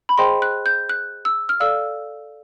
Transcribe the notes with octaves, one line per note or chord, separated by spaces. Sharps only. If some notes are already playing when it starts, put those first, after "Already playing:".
B5
G#4 C5 D#5 G5 C6
F#6
G6
F#6
E6
F6
A4 D5 F5 E6